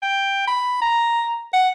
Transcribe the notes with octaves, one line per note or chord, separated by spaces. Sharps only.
G5
B5
A#5
F#5